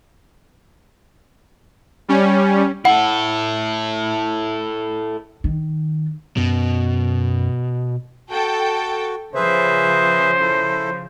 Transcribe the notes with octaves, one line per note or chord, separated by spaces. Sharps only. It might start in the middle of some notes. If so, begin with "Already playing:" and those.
G3 C#4
E4 A4 F#5
D#3
F#2 B2
F#4 A4 G5
C#3 F3 G#4 B4 C5 E5
E4 A4